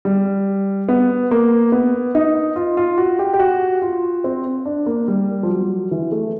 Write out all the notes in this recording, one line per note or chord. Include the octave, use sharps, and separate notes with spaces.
G3
B3
A#3
B3
D#4
F4
F4
F#4
G4
G4
F#4
F4
C4
D4
A#3
G3
F3
F#3
E3
A3